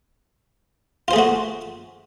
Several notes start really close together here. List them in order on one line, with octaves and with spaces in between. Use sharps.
F4 C5 G#4 A3 F#4